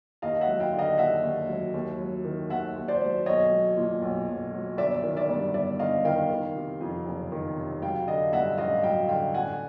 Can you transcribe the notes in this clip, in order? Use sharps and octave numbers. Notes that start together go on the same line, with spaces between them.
D#2 D#5 F5
E5 F#5
F#3
F5 G5
D3
D#5 F5
D#2 E5 F#5
D#2
F#3
D#2
F#3
D#3
D#2 E5 F#5
D#2
C5 D5
F#3
B1 C#5 D#5
F#3
A#2
B1
B1
F#3
G1 D5 E5
D#3
D5 E5
G2
G1 D5 E5
G1 D#5 F5
D#3 F5 G5
D#3
C3
F2
F#1
D#3
C3
F#3 F5 G5
D3 D#5 F5
G2 E5 F#5
A1 D#5 F5
F#3 F5 G5
D3 F5 G5
A1 F#5 G#5